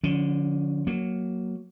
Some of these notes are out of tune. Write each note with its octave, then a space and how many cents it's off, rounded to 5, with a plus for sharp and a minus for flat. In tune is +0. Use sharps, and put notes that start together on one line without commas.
D3 +0 F3 +30 C#4 +30
F#3 +0 A#3 +5